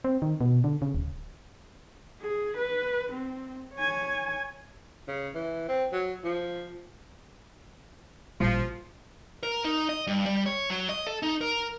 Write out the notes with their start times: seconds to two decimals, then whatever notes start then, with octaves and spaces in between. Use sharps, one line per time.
0.04 C4
0.22 D#3
0.41 B2
0.64 D3
0.82 C#3
0.95 D1
2.21 G#4
2.57 B4
3.12 C4
3.75 C#5 G#5
5.08 C#3
5.34 E3
5.68 C4
5.92 F#3
6.24 F3
8.40 A1 A#2 F3 G3 F4
9.43 A#4
9.64 D#4
9.89 D#5
10.07 G2
10.25 G3
10.46 C#5
10.70 F#3
10.89 D#5
11.07 A4
11.23 D#4
11.41 A#4